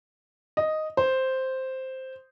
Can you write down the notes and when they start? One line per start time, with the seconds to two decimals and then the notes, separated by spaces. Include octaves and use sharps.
0.57 D#5
0.97 C5